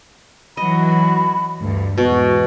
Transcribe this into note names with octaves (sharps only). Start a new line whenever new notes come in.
E3 F#3 F#4 D#5 B5
D2 G2
E2 G#2 B2 F#4